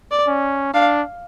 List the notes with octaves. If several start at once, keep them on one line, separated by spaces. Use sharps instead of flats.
D5
C#4
D4 F5